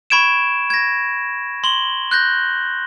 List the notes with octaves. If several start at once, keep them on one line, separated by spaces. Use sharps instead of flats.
B5 C#6 G#6 D7 E7
G#6 A#6
C6 F#7 G7
F#6 G6 A#6